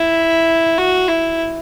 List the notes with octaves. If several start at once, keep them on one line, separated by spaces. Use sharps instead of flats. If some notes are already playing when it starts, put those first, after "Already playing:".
Already playing: E4
F#4
E4